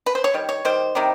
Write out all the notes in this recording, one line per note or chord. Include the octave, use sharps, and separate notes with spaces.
B4
C5
C#5
D#3 G3
C#5
D#3 G3 C5
C3 D#3 G3